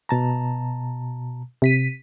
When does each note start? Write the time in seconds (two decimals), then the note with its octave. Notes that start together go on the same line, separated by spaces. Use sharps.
0.09 B2 A5 A#5
1.62 C3 B6 D#7